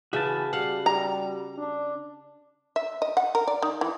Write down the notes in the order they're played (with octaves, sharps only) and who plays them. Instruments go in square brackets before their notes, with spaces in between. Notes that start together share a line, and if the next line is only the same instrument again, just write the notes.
[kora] C#3 E5 [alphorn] E3 [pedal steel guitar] F#4 A5
[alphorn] G3 [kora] F5 F#5
[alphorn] G3 [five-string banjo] A#5
[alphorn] D4
[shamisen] E5
D#5
F#5
A#4
D5
D#3
E3